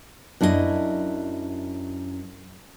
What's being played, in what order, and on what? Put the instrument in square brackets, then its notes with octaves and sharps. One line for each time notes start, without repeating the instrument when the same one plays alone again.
[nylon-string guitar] F#2 D4 E4 F4 D#5